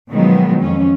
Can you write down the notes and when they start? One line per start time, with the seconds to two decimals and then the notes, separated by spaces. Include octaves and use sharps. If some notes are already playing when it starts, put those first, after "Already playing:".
0.10 B2 D#3 F3 F#3 G#3 B3
0.61 F2 C#4